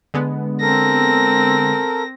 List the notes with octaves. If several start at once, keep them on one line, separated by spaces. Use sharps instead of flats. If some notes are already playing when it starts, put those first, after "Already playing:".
D3 G#3 B3
C4 A4 A#4 A#6